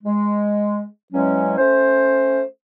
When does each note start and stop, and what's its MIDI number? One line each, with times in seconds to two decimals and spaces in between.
0.04 0.84 56
1.13 1.55 40
1.13 1.55 54
1.13 1.55 56
1.13 1.55 61
1.58 2.41 57
1.58 2.41 61
1.58 2.41 72